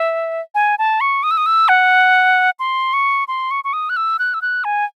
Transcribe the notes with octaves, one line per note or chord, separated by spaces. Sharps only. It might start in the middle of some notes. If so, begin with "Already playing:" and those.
Already playing: E5
G#5
A5
C#6
D#6
E6
D#6
E6
F#5
C6
C#6
C6
C#6
C#6
D#6
F#6
E6
F#6
E6
F#6
G#5